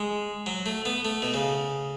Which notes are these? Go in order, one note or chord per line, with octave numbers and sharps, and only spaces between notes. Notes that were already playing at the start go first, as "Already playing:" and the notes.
Already playing: G#3
F#3
A3
B3
A3
B2
C#3